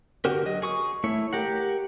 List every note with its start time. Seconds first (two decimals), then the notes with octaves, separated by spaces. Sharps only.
0.25 D3 F#4 G4 A#4
0.45 F#3 D#5
0.62 G#4 C#6 D#6
1.04 A3 E4 C#5
1.33 G4 A#4 F#5